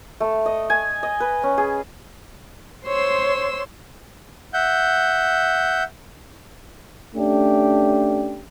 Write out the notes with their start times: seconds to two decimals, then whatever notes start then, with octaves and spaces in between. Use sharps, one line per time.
0.20 A3
0.46 D#5
0.70 G#5
1.03 D#5
1.20 B4
1.43 C#4
1.58 G#4
2.85 C5 C#5 C6 E6
4.54 E5 F#5 G6
7.16 A3 C#4 D4 G4